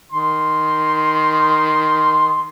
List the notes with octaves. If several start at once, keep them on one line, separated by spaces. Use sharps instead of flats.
D#3 C6